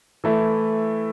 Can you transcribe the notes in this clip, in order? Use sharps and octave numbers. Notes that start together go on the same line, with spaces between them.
E3 A3 E4